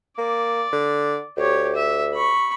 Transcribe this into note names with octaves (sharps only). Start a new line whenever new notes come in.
A#3 D5
D3
D2 G4 C#5
E5
B5 C#6